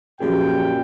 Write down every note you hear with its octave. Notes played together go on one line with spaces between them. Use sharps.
F#2 A#2 F3 G4 G#4 G5